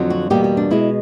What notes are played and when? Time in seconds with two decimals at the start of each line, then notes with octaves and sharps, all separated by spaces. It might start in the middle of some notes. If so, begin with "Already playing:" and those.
Already playing: F2 D3 F#3
0.10 F#4
0.30 E2 B2 G3 A#3 G4
0.44 G4
0.57 D4
0.71 B2 G#3 E4